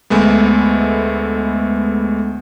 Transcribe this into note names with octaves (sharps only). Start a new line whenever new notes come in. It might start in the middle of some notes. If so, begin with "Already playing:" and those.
D2 G#3 A3 B3